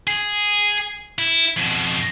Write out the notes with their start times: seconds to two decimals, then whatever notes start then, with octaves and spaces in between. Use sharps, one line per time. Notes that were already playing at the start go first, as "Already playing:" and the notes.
0.07 G#4
1.18 E4
1.57 F2 B2